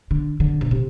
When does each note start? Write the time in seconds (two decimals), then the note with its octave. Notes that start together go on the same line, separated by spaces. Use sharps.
0.11 D3
0.40 D3
0.61 B2
0.71 C3